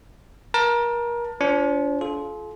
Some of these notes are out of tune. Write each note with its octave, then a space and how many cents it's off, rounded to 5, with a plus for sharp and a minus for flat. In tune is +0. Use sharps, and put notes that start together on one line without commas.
A#4 +30 A5 +30
D4 -40 F4 -15 C5 +15
F4 +0 A4 -45